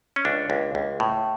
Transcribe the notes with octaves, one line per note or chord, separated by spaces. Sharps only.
C#4
C#2 D4
C#2
C#2
A2